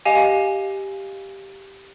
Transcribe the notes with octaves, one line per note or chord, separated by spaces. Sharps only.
G4 D#5 F5 G#5